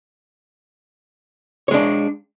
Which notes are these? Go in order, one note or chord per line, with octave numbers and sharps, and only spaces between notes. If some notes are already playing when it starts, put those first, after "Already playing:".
G#3 D4 C#5